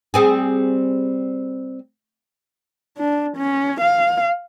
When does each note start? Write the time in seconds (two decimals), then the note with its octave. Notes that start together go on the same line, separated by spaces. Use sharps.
0.14 G3 C4 G#4
2.98 D4
3.37 C#4
3.81 F5